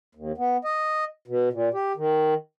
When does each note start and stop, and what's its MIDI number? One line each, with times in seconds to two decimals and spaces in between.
0.15 0.32 39
0.38 0.57 59
0.65 1.04 75
1.28 1.49 47
1.53 1.69 46
1.74 1.92 67
1.96 2.34 51